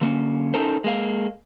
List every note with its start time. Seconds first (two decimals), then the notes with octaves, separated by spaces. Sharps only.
0.01 D3 A#3 C#4
0.54 C#4 D#4 A4 A#4 C5
0.84 G#3 A#3 F5